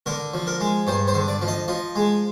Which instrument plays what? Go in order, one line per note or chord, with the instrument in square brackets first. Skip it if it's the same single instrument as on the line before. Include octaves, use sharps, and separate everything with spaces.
[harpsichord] D3 A#4
F3
A#4
G#3
G2 C5
C5
D3
D5
F3
D#5
F3 D#5
G#3